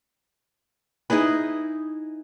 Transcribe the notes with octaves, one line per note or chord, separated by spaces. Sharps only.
D#4 E4 G#4 B4